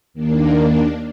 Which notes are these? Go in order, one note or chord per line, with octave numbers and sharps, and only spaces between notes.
D#2 D#3 A#3 D4